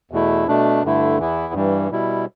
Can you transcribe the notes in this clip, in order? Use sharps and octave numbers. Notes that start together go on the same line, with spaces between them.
E2 B2 A3 E4
B2 A3 D4
G2 D3 A3 E4
E2 E3 B3 E4
G2 E3 G3
B2 G3 E4